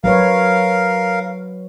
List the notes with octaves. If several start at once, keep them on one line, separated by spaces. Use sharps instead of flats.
F#3 A#4 B4 C#5 F5